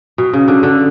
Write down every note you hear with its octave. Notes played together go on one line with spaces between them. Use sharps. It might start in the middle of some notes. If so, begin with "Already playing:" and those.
B2
C#3
D3
D3